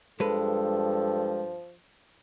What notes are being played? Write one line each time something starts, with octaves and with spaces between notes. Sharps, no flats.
G2 F3 G#3 A4 B4